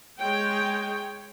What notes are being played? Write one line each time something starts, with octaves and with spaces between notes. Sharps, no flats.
G#3 C#5 G5